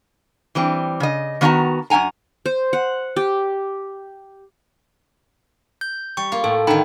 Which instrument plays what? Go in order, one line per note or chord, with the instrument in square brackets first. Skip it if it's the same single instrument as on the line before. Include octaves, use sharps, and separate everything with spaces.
[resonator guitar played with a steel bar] E3 G3 C4
C#3 D#5
D#3 B3 F#4 D#5 A5 A#5
F#2 A3 F#5 G#5 A#5
[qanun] C5
F#5
G4
[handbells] G6
[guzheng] G3 [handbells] C#6
[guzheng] A#3 F4
[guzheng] A2 [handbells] A4
[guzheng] D3 D#3 [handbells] D#4 G5 B5